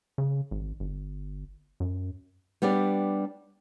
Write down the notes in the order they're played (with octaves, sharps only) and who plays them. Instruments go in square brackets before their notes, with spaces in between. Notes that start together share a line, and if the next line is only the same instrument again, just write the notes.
[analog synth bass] C#3
G#1
G1
F#2
[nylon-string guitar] G3 B3 D4 G4 D5